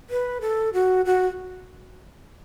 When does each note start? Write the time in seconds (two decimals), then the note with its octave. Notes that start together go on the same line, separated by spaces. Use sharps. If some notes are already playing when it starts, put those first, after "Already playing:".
0.10 B4
0.41 A4
0.73 F#4
1.05 F#4